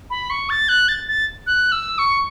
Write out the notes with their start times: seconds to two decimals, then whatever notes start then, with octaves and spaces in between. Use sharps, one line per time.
0.10 B5
0.30 C#6
0.50 A6
0.69 F#6
0.88 A6
1.08 A6
1.47 F#6
1.72 E6
1.98 C#6